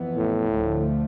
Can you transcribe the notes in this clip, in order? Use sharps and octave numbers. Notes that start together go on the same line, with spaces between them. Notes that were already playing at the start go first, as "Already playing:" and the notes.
Already playing: F2 E3 B3
A2
D2 D3 F3 A3